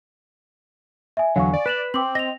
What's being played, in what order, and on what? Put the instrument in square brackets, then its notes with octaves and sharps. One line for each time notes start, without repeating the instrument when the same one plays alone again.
[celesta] E5 G#5
[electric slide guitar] E2 D3 [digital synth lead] F#3 [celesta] F5 G#5 C#6
[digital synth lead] D5
[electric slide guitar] B4 [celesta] F#6 E7 F#7
[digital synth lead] C4 [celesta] G5 D6 F#7
[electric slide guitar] D#5 [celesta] A#6 F7